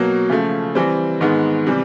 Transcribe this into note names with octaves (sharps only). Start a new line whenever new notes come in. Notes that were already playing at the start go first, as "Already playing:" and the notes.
Already playing: B2 F#3 A#3
C#3 F3 A3
E3 G3 C4
G#2 D#3 G#3 B3
C3 E3 G3